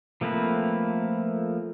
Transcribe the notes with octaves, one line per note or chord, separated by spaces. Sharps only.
F3 A3 A#3 C4 B4